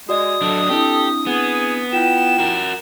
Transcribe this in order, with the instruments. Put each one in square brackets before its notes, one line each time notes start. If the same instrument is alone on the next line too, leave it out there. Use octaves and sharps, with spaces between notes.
[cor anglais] G#3 [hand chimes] F#4 D5 D#5 [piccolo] D#6
[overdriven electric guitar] F#3 D4 [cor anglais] A4
[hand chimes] C4 D4 E4 [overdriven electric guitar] G4 [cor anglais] A4
[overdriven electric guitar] B3 [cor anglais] G#4
[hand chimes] E4 F4 [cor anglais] G5 [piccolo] E7
[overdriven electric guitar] F#4 A#4